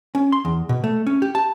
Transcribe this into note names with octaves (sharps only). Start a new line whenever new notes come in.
C#4
C6
E2
B2
A3
C#4
G4
A5